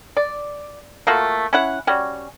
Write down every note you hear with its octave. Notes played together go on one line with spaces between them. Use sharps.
D5
A3 A#3 F4 F#4
C#4 E4 F#5
G3 C#4 F#4